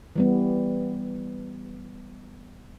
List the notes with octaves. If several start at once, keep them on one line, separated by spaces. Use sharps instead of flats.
E3 G3 B3